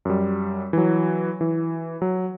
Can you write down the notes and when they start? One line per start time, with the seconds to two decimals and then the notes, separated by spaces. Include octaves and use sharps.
0.05 F#2 G3
0.73 E3 F#3
1.41 E3
2.02 F#3